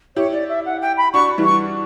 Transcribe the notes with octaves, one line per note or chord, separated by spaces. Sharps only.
E4 G4 C#5
D5
E5
F#5
G5
B5
D4 F#4 C#6
E3 G3
C#6